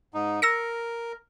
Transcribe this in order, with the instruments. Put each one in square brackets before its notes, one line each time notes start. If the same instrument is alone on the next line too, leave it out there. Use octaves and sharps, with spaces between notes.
[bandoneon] G#2 D#4
[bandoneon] A#4 [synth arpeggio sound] E6 A#6 C#7